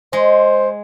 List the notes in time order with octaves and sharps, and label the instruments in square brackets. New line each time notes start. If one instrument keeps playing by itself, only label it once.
[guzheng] G#3 [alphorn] C5